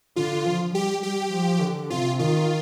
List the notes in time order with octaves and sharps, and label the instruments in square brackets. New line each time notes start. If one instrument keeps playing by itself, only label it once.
[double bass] D3 [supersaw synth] F4
[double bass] F3
[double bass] G3 [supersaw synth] G4
[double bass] G3 [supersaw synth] G4
[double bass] F3
D3
[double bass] C3 [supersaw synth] F4
[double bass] D#3 [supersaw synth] F4